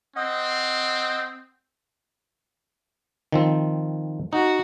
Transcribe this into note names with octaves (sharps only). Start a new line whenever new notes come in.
C4 D#5 F#5
D#3 F3 C4
D#4 F#4